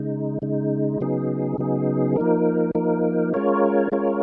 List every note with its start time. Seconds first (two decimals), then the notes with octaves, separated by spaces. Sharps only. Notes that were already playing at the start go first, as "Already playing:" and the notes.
Already playing: C#3 G#3 D#4
0.42 C#3 G#3 D#4
1.01 C#3 F#3 B3 D#4 G#4
1.58 C#3 F#3 B3 D#4 G#4
2.16 F3 A#3 D#4 A#4
2.75 F3 A#3 D#4 A#4
3.34 G#3 C#4 F4 A#4 C#5
3.92 G#3 C#4 F4 A#4 C#5